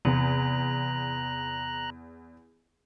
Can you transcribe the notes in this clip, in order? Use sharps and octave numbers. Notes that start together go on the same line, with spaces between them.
E2 C3 A#5 F#6